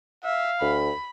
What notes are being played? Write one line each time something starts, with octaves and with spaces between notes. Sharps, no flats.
E5 F5
D2 B5